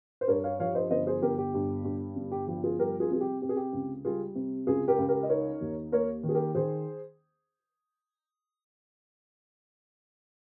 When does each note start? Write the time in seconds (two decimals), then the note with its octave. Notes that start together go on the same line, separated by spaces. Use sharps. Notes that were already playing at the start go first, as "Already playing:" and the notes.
0.21 C5
0.28 G2 A#4 C#5
0.44 C#5 F5
0.60 F3 C#5 F5
0.75 C5 D#5
0.91 G1 C5 D#5
1.07 G#4 C5
1.22 G1 G4 A#4
1.38 G4
1.54 G2
1.85 G2
2.16 G1
2.32 G4
2.48 F3 G4
2.63 F4 G#4
2.79 G3 G4 A#4
3.00 F4 G#4
3.10 C3 G#4
3.21 G4
3.42 C3 G4
3.49 G#4
3.56 G4
3.73 C#2
4.05 G3 F4 G#4
4.35 C3
4.67 C#2 F4 G#4
4.88 G4 A#4
4.98 C#2
5.08 G4 A#4
5.23 D#5
5.29 D#4 A#4 C#5
5.61 D#2
5.92 A#3 A#4 C#5
6.23 D#3
6.29 G#4
6.34 G4 A#4
6.55 D#3 G#4 C5